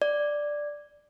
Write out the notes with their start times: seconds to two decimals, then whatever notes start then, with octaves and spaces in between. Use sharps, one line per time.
0.02 D5